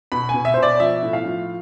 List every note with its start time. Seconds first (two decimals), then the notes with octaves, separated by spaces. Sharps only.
0.12 B2 B5
0.29 G#5
0.34 B2
0.45 E5
0.54 C5
0.57 B2
0.63 D5
0.80 F3 E5
1.03 A2
1.13 F5
1.25 F3